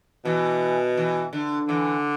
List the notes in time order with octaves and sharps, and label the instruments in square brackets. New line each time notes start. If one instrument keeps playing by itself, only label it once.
[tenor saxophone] B2 [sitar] E3
[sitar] E3
D3
[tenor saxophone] D3 [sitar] E3